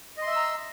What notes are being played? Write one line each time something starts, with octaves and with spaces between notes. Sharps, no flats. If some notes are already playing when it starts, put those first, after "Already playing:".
D#5 E5 A#5 C6 E6